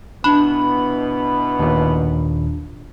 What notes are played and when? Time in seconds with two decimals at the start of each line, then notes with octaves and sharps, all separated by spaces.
0.24 B2 E3 B3 D4 B5
1.59 D#2 A#2